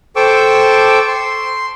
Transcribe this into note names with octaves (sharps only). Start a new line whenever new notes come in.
A4 C5 G5 C#6 D6 E6
C6